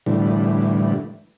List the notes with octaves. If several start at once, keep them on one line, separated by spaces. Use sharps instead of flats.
A2 D3 E3 G3